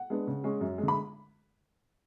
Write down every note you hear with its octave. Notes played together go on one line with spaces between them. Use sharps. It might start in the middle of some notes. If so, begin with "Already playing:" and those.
Already playing: F#5
G#3 B3 D4
C#3
G#3 C#4
F#2
G#3
D3 B5